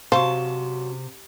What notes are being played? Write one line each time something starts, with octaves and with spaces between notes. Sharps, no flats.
F#2 C3 C5 F5 A5 C#6